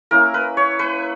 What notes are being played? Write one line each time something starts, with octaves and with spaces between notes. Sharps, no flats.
A#3 C#4 E4 A#4
B4
C#5
B4